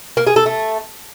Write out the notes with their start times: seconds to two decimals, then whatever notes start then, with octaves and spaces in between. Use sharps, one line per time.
0.17 A#3
0.27 G#4
0.36 A4
0.46 A3